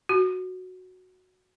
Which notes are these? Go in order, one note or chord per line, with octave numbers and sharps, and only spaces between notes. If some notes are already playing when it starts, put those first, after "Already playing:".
F#4